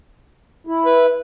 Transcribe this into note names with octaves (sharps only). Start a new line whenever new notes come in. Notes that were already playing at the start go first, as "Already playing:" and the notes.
E4
B4